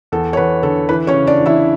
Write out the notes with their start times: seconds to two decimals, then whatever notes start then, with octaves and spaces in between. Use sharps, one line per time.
0.12 E2 A4
0.33 C#5
0.37 E2 B4
0.63 D3 A4
0.89 E3 B4
1.07 C#4 C#5
1.14 C#3
1.26 D4 D5
1.40 E3
1.46 E4 E5